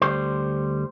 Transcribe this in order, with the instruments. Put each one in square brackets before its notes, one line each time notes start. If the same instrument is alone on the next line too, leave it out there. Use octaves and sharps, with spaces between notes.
[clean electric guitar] D2 G3 C5